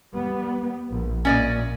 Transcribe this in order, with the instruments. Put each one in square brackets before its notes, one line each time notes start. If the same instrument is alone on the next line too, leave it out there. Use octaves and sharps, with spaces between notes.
[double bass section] G3 B3
A#1
[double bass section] A#2 [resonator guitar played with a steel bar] C#4 D5 D#5